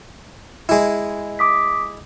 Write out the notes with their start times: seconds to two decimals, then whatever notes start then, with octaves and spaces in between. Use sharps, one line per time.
0.69 G#3 E4
1.39 D6 D#6 B6